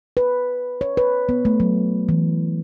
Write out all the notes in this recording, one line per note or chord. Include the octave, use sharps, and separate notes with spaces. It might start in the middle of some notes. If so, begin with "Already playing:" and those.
B4
C#5
B4
B3
A3
F#3
E3